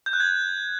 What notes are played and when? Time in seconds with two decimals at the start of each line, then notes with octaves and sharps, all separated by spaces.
0.06 G6
0.13 F#6
0.20 G#6